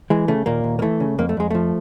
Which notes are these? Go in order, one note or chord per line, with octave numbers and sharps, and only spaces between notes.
E3 G#3
C#3 A3
D#2 A#2 A#3
D#2
A#3
E3 A3
C#3
F2 A#3
A3
F2 G#3
F3 A3